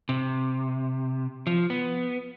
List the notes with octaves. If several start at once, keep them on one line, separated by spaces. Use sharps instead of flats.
C3
F3
B3